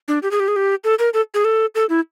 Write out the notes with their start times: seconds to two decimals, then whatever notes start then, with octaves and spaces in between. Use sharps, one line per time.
0.08 D4
0.23 G4
0.31 G#4
0.40 G4
0.48 G#4
0.56 G4
0.84 A4
0.99 A#4
1.14 A4
1.34 G#4
1.44 A4
1.75 A4
1.89 E4